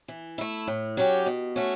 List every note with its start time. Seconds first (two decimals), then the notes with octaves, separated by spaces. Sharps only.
0.08 E3
0.38 A3 E4
0.67 A2
0.97 F#3 C#4 G4
1.26 B2
1.56 A3 C#4 F#4